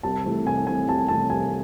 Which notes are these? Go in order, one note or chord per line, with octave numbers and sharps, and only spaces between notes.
C2 A5
C3 E3 A3
C2 G#5
C3 E3 A3 G#5
C2 A5
C3 E3 A3 A5
C2 G#5